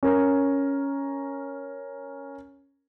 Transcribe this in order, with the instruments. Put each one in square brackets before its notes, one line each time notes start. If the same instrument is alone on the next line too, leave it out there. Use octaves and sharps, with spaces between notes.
[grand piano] C#4 A#4